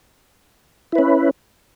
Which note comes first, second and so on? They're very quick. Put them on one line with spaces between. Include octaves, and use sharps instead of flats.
E4 B4 C#4